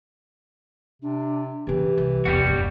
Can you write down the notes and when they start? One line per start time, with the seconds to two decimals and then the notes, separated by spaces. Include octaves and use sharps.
1.02 C3 D4
1.67 C#3 E3 C#4 G4
1.98 C2
2.25 E1 G3 F#4
2.46 F#1 D#2